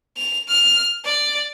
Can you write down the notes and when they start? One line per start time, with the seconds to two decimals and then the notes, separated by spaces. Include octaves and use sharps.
0.18 F7
0.48 F6
1.05 D5